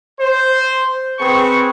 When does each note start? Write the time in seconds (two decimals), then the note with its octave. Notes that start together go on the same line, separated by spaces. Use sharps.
0.20 C5
1.19 C4 G#4 B4 C#6